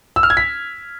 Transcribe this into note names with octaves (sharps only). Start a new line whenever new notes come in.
E6
F6
G#6
B6